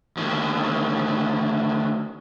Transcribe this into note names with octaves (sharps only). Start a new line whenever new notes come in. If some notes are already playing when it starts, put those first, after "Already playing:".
D2 D#3